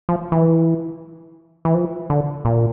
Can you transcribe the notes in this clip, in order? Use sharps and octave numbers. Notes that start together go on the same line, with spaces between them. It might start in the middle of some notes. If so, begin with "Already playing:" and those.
F3
E3
E3
F3
D3
A#2